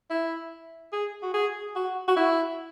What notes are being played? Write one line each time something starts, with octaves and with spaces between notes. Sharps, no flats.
E4
G#4
F#4
G#4
F#4
F#4
E4